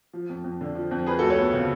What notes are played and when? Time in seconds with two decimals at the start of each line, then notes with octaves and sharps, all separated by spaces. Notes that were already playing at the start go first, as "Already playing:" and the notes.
0.13 F3
0.29 F2
0.44 F2
0.61 D3
0.75 F3
0.91 F2
1.06 F3 G#4 B4
1.19 D2 F#4 A4
1.30 A4 C#5
1.38 B3
1.53 C#3